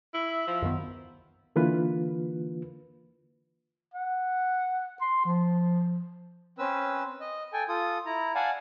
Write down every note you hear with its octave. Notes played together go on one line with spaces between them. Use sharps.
E4
E5
F3
F#2 D#3 B3
D3 E3 A#3 F4 B4
F#5
C6
F3
C4 C#4 B4 E6
D#5
A4 G5 G#5
F4 A4 D#6
E4 A#5
D5 F5 F#5 G#5 A5